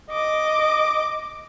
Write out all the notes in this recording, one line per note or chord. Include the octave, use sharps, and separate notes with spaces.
D#5 D6